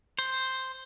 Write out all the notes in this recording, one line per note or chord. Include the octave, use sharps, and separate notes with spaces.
C5